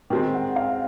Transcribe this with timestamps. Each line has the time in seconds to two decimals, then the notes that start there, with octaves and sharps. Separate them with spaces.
0.10 D#3 G#3 C4 G5
0.34 F#5
0.56 F5